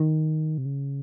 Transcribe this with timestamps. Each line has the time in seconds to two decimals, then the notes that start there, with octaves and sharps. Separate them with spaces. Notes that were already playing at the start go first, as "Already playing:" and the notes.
Already playing: D#3
0.58 C3
0.65 C#3